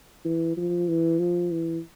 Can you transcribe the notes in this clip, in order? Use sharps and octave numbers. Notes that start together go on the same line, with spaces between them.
E3
F3
E3
F3
E3